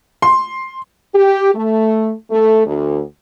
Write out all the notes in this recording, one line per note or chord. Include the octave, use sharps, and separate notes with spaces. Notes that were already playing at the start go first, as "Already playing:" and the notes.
C6
G4
A3
A3
D2